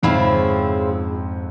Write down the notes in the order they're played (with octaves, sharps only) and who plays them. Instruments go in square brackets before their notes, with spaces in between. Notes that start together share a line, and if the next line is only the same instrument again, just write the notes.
[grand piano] F2 G#2 [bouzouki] C#3 F3 C4 E4